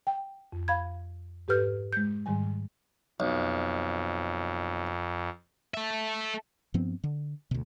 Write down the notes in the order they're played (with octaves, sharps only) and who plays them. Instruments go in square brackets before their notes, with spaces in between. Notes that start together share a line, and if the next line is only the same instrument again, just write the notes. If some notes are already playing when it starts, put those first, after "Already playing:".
[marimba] G5
F2
F5 B5 G#6
G#2 G4 A4 B4 F6 G6
G#3 G6
G#2 D#3 G3 G#5
[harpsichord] B1 [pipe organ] F2
[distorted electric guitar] A4 E5
[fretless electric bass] G2 F3 B3 C4
D3
D2 B2